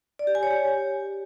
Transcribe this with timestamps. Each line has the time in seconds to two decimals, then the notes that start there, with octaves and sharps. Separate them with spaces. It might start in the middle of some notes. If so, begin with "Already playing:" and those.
0.19 D5
0.27 G4
0.35 G#5
0.43 C#5
0.51 G4